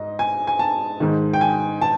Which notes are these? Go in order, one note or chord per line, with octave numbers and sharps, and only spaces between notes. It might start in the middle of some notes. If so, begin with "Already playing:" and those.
Already playing: G#2 D#5
G#5
G#5
A5
G#2 D#3
G5
G#5
A5